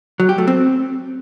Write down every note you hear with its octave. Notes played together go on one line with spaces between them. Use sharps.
F#3
G4
A3
C4